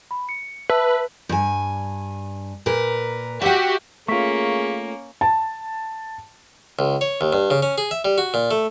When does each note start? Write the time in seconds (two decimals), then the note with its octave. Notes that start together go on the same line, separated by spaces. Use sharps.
0.11 B5
0.29 C#7
0.70 B4 E5 A5 E6
1.29 G2 G#5
2.66 A#2 A#4 B4
3.42 F#4 G4 E5 F#5
4.08 A3 A#3 C#4 F4 G#4 C#6 B6
5.21 A5
6.79 C#2
7.01 C#5
7.21 D#2
7.33 G2
7.51 C#3
7.63 C#4
7.78 G#4
7.91 E5
8.05 G3
8.18 F#4
8.34 A#2
8.51 A3